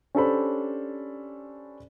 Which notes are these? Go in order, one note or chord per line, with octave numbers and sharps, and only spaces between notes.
C#4 D4 G4 A4 C5 B5